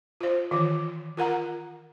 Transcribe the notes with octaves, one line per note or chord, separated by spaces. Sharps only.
F4 C5
D#3 E3 F4
F4 A#4 F#5 A#5